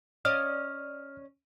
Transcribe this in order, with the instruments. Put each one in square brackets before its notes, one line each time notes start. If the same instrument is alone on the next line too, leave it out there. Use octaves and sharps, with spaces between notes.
[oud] C#4 D5 D#5 [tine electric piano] F6